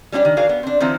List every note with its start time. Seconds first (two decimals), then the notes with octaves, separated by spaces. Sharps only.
0.12 G3 C#4 D4 F4 G4
0.25 D#3
0.37 F#4 G#4 A#4 D5 F5
0.49 B3
0.63 C4 D4
0.80 D#3 F3 C4 D#4 E4